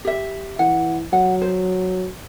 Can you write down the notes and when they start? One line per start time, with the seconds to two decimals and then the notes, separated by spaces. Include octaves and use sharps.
0.05 G4 E5
0.59 E3 F#5
1.13 F#3 F#5
1.42 C5